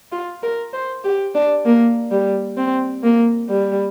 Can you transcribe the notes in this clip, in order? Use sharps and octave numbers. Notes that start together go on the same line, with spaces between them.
F4
A#4
C5
G4
D4
A#3
G3
C4
A#3
G3